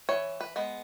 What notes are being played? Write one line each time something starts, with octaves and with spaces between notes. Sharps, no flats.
E3 C#5
B4
G#3 B3